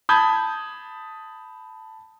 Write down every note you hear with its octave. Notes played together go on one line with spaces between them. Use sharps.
A5 B5 D#6 G6 G#6